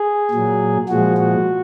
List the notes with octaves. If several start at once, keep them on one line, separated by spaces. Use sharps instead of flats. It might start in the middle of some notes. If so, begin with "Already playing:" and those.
Already playing: G#4
A#2 F#3
A#2 F3 G#3 F#4
F#4